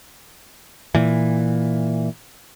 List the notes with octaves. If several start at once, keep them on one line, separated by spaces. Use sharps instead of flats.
A#2 E3